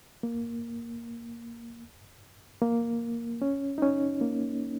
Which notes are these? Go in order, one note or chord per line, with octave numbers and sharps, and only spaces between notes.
A#3
A#3
C#4
D#4
C#4
A#3